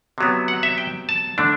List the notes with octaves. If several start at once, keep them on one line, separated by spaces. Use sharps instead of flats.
C3 F#3 B3
F#5
E5
G5
A5
D3 A3 D4